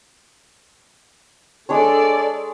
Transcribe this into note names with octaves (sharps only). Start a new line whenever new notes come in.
G#3 D4 A4 C#5 D5